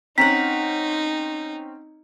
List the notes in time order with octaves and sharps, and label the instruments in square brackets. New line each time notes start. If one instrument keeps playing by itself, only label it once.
[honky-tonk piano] C4 C#4 [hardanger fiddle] D#4 [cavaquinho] F#5 A#5 [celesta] B6